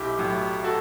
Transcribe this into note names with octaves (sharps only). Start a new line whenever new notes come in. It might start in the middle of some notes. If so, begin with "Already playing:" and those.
Already playing: B1 E4 G4
A2 F#3
F#4 A4